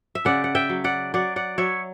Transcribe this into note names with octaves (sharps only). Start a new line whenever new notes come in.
E5
C#3 D5 F#5
F#5
E5 G5
F#3
D5 F#5
F#3 D5 F#5
D5 F#5
F#3 C#5 E5